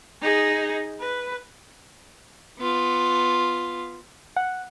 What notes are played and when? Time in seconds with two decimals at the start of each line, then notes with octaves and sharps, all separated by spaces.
0.21 D#4 G#4
1.00 B4
2.59 B3 F4
4.37 F#5